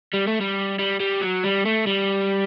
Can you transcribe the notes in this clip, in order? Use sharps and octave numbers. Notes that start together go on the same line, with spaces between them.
G3
A3
G3
G3
G3
F#3
G3
A3
G3